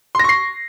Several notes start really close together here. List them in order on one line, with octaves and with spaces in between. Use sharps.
C6 A#6 C#6 C7